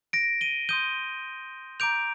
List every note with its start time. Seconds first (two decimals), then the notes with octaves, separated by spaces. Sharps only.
0.13 A#6 D7
0.41 D#7 G7
0.69 C6 D#6 G6 D#7 G7
1.80 A#5 D6 G6 D7 F7